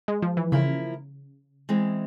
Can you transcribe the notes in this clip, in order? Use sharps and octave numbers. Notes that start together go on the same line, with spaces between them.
G#3
F3
E3
C#3 F3 A#3 E4 A#4
E3 G#3 C4